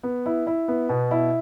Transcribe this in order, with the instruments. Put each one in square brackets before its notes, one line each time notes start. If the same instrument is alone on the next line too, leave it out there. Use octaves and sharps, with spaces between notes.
[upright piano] B3
E4
E4
B3
B2
E4